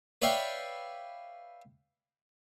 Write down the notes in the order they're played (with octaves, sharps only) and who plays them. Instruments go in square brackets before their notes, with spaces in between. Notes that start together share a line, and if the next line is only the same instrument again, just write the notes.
[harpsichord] B4 C#5 D5 E5 F5 G5